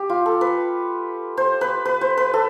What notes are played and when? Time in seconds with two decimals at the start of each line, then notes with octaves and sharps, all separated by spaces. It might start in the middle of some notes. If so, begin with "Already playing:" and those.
Already playing: G4
0.09 F4
0.26 A4
0.41 B4
1.37 C5
1.61 B4
1.85 B4
2.01 C5
2.17 B4
2.34 A4